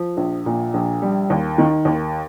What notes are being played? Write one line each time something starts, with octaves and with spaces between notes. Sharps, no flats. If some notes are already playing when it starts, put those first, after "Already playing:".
Already playing: F3
A#1
A#2
A#1
G3
D#2
D#3
D#2